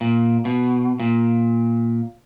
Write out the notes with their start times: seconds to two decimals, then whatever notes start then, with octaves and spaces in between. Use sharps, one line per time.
0.01 A#2
0.45 B2
1.00 A#2